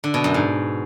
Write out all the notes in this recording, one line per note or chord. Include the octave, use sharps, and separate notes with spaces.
D3
B2
F#2
G#2